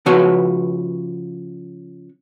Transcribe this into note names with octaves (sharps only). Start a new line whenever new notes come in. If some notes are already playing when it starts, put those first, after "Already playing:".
C#3 F3 F#4 B4 C#5